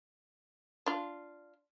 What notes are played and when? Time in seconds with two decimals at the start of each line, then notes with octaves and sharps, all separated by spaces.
0.86 D4 F4